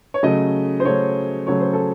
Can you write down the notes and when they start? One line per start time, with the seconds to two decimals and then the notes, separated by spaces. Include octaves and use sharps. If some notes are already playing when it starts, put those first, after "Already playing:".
0.14 C#5
0.23 C#3 F#3 A3 D#5
0.80 C5
0.85 C#3 F#3 A3 C#5
1.47 C#3 F#3 A3 C#5
1.60 C5
1.73 A4